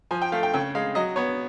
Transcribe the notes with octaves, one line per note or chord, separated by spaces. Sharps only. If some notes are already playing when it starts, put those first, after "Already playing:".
F3 G#5
G5
A3 F5
G5
C#3 G5
G#3 F5
F#3 D#5
B3 C#5